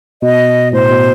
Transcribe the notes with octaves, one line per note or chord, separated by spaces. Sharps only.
B2 D#5
A2 C5
B2